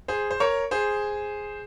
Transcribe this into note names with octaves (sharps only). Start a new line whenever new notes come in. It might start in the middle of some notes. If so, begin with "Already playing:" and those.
G#4 C5
C5
A#4 C#5
G#4 C5